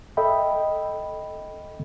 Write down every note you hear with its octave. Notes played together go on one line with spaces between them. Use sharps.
A4 D#5 E5 G5 B5